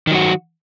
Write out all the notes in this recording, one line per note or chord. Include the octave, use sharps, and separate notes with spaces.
D#3 F#3 F#4